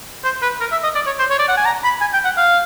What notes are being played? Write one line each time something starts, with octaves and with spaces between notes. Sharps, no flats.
C5
B4
A#4
E5
D#5
D5
C#5
C5
C#5
D5
F#5
G#5
A#5
B5
G#5
G5
F#5
F5